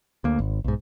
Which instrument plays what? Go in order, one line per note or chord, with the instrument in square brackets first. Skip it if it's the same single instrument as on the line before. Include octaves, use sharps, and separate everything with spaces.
[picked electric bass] D2 A#3
G#1
B1 G#2